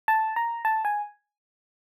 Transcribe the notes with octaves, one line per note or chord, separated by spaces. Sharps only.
A5
A#5
A5
G#5